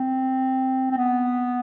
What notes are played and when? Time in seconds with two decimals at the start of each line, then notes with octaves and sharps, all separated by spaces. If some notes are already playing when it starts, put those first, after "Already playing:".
Already playing: C4
0.91 C4
0.98 B3